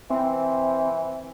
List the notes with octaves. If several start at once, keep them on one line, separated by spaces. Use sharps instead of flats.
E3 C4